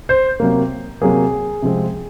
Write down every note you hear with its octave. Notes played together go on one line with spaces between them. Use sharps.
C5
C3 F#3 A#3
C3 F#3 A#3 G#4
C3 F3 G#3 C4